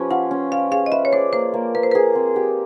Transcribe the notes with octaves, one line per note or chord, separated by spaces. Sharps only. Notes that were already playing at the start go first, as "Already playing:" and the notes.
Already playing: F3 C#4 G4 B4
F4 F#5
C#4
D5 F5
G#4 F5
D#5
B4 E5
C#5
C5 D5
A#3 C5
A#3
A#3 B4
C5
G#4 B4
C4
G4